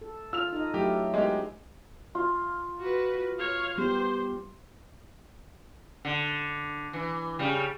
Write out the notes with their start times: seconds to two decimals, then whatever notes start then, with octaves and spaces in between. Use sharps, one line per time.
0.01 A4
0.33 F4 E6 F6 F7
0.53 D#4 A4 D#5
0.74 F#3 A3 E4 G4
1.14 G#3 B3 D#4 G4
2.15 F4
2.79 F#4 B4
3.39 C#5 F5
3.78 G3 B3 G4 C5
6.05 D3
6.93 E3
7.39 C#3 G3